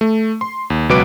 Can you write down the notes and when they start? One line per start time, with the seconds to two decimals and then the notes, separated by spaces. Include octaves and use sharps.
0.01 A3
0.41 C6
0.70 D#2
0.89 C#2 B2 F#3 B4 D6 D7